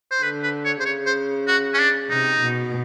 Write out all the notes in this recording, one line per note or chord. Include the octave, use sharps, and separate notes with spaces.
C5
D3 B4
B4
C#5
C5
C#3 C#5
C5
F#4
C#4
D4
C3 D#4
B2